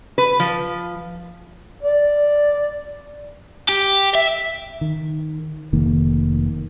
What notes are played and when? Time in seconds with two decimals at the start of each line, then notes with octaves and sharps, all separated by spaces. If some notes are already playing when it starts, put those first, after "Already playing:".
0.18 B4
0.40 F3
1.83 D5
3.69 G4
4.15 E5
4.81 D#3
5.73 F1 D#3 A#3